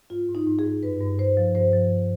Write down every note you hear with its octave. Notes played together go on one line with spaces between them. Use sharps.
G#2 F4
G#2
D#4
G#2
G#4
G#2
G2 B4
G2
G2 C5
F3
G2 C5
F3